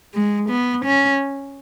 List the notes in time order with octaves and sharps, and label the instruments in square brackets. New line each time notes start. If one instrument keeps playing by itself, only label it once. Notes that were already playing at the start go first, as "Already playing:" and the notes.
[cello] G#3
B3
C#4